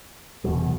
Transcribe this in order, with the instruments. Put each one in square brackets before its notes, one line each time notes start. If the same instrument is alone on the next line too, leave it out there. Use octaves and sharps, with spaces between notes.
[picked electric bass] F1 E2 B2 F#3